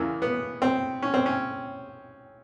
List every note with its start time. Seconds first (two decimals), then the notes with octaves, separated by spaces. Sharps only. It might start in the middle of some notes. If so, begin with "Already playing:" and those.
Already playing: E2 C#3 E3 A#3
0.22 B3
0.62 C4
1.02 C#4
1.14 C4
1.26 C#4